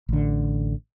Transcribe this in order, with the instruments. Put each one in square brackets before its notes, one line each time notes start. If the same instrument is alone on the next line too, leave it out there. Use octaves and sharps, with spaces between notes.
[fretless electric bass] A1 D3